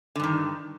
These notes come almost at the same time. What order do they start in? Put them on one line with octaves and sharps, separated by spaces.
D3 G2 D#3